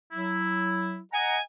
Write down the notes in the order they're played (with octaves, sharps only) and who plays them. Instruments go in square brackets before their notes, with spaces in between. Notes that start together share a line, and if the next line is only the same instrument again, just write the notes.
[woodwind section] F#3 E4
[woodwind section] D#5 F#5 A#5 [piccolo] G#5